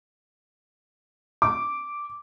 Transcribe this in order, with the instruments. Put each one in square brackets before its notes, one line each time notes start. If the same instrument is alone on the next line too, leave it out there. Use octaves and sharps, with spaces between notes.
[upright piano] D6